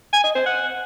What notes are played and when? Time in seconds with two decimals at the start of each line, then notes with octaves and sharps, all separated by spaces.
0.13 G#5
0.24 D#5
0.35 C5
0.46 F#5